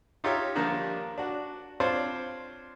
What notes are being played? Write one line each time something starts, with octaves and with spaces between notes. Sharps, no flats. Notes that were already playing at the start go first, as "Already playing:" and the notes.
D#4 F4 G4 C#5 E5
D3 D#3 F3 G3 A#3
D4 F#4
C4 D4 F4 C5 C#5